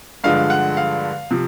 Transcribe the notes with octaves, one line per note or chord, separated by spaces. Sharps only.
G2 D3 F3 G#3 F5
F#5
F5
C3 F3